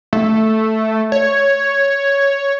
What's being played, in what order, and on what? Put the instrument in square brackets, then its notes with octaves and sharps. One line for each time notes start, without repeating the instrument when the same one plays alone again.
[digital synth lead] A3
C#5